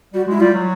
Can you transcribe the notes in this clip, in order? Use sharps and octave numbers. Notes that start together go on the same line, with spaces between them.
G3 F#4
G#3 E4
G3 F4
F#3